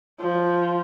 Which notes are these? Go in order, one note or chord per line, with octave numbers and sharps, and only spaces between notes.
F3